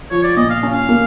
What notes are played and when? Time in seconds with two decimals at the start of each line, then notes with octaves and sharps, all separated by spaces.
0.11 F3 C#5
0.23 D5
0.37 A#2 D#5
0.50 F5
0.63 C#4
0.72 F5
0.89 A#3